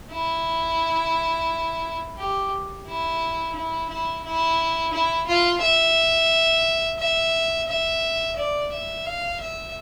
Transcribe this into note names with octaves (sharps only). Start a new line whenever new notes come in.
E4
G4
E4
E4
E4
E4
E4
F4
E5
E5
E5
D5
E5
F5
E5